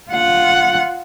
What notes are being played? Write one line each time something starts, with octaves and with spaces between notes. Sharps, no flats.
F4 F#5